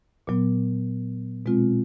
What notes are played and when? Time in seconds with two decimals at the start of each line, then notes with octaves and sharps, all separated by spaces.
0.27 A#2 F#3 B3
1.46 B2 G#3 C4 F4